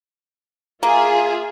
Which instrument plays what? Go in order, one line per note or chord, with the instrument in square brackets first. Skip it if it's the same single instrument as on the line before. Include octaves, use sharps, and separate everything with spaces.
[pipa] A#3 [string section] F4 G#4 E5